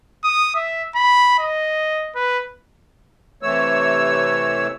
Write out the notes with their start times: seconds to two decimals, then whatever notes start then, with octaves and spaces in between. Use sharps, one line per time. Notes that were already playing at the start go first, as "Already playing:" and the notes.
0.24 D#6
0.55 E5
0.95 B5
1.39 D#5
2.15 B4
3.43 C3 E3 A3 C#5 E6